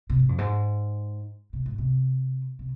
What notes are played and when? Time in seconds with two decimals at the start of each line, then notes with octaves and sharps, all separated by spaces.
0.10 C3
0.19 G#2
0.29 F2
0.38 G#2
1.53 C3
1.66 G#2
1.78 C3
2.59 C3